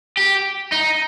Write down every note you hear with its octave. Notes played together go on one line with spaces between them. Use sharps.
G4
D#4